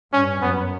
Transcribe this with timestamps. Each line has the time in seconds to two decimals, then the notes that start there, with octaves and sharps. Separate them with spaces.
0.13 G2 C#4
0.42 F#2 B3